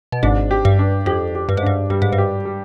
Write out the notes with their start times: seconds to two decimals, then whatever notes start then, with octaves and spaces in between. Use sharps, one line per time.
0.12 B2
0.23 G#1 G#2 D4
0.51 G4
0.65 G2
0.79 D4
1.06 F2 G4
1.35 G4
1.49 G2
1.57 G#2
1.62 G2 D4
1.90 G2 G3
2.02 G#2
2.12 G2
2.18 G4
2.45 G3